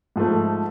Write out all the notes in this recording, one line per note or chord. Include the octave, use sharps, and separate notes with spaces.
G#2 F3 A3